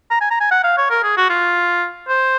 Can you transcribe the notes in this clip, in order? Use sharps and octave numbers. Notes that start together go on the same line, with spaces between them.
A#5
G#5
A#5
G#5
F#5
F5
C#5
A#4
G#4
F#4
F4
C5